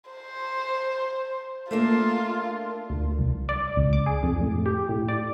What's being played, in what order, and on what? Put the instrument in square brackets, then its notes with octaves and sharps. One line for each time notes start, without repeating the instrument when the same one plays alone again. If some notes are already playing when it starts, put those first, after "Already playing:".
[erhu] C5
[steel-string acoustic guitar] A3 A#3 D4 [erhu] F4
[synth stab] D2
C2
D5
C#2
D6
G#4
F2
A2
G4
A2
D5